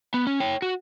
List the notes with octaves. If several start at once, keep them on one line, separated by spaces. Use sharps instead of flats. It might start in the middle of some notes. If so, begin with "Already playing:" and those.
B3
C#4
C#5 G5
F#4